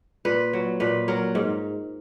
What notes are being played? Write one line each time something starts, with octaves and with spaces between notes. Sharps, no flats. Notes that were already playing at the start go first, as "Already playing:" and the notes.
A#2 B4
F#3
A#2 B4
F#3 A#4
G#2